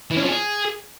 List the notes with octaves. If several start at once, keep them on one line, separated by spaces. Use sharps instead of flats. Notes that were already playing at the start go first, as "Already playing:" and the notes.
E3
C#4
F3
G#4